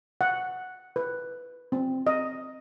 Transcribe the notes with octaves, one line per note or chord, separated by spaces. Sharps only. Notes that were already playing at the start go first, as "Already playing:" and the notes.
F#5
B4
C4
D#5